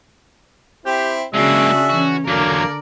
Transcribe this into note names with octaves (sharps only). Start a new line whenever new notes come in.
C4 E4 G4
C#3 G#3 A#3 D4 F#4 G#4 E5
E3 C#4 F#4
E2 D3 F#3 A#3 A#4 D5